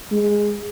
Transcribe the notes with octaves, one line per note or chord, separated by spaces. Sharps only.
G#3